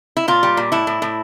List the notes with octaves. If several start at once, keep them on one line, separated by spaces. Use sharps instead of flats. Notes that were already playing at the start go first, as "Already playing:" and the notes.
E4
A#2 F4
G3
A#2
A2 E4
A2
A2